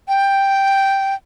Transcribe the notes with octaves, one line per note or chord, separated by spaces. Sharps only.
G5